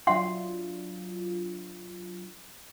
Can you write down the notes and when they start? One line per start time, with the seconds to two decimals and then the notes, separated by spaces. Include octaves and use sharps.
0.07 F#3 D4 F4 E5 F#5 C6